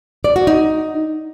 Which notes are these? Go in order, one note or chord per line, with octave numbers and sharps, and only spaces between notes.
D5
F#4
D#4